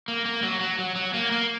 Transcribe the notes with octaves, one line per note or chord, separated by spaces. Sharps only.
A#3
A#3
F#3
F#3
F#3
F#3
A#3
A#3